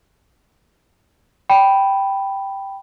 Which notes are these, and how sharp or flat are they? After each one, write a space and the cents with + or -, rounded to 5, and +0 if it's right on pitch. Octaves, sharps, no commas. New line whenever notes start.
G5 -5 B5 +0